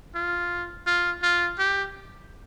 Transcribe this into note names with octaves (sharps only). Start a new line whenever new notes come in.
F4
F4
F4
G4